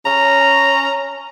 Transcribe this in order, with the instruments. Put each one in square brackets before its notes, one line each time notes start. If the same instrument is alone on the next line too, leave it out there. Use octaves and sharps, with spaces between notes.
[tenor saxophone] C#4 [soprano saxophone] A#5